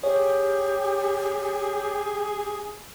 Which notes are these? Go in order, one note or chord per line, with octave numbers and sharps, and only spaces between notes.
G4 G#4 C#5